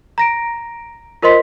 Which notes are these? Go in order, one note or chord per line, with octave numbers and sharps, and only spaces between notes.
A#5 A#6 D7
F4 A#4 C5 D#5 C6 B6